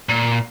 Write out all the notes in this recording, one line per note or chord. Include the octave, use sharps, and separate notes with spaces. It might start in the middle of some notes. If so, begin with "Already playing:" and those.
A#2